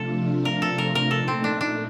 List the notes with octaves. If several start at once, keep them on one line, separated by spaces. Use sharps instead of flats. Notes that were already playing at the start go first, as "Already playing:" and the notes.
Already playing: C3 F3 A3 D4 F4 A4
A#4
A4
A#4
A#4
A#2 A3 D#4 A4
C4
D4
D4